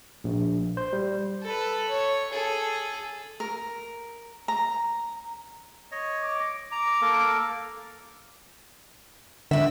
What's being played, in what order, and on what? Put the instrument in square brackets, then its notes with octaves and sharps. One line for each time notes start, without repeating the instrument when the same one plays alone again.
[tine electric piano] A#1
C5
G3
[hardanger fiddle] A4 B4
C#5
G#4 A4
[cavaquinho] A#4
A#5
[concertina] C#5 D#5
[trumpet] D6
[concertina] A#5 [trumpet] D6
[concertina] A#3 A4 A#4
[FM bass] D3 [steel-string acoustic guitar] C4 E5